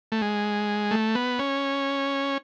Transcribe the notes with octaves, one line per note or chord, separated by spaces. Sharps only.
A3
G#3
A3
B3
C#4